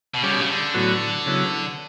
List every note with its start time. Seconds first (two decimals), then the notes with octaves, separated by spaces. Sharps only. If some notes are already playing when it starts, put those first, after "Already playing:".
0.14 B2
0.23 C#3 G3 C#4 G4
0.32 B2
0.41 C#3
0.49 D3
0.74 A2 F#3 B3 F#4
1.26 C#3 F#3 B3 E4